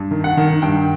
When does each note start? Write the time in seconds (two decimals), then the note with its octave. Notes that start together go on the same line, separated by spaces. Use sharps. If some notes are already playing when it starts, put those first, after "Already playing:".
Already playing: G2
0.11 D#3
0.24 F#5
0.37 D#3
0.62 G2 G5